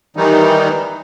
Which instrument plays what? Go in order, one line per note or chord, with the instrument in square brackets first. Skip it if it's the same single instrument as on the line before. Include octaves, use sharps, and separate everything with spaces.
[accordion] D#3 E3 G3 D#4